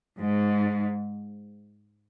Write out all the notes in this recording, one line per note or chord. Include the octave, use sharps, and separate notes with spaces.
G#2